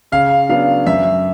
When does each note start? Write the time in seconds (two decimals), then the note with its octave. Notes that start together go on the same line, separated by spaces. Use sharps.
0.12 C#3 F5
0.49 F#3 B3 D4 F5
0.87 F#2 E5